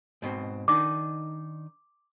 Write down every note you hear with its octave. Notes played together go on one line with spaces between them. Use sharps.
G#2 B2 C4
D#3 D4 D#4 D6